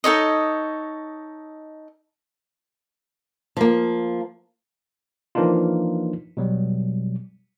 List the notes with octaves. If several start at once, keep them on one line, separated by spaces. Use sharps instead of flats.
D#4 A4 C#5 D#5
F3 A#3
E3 F3 A#3 D4 D#4 F4
B2 F#3 G3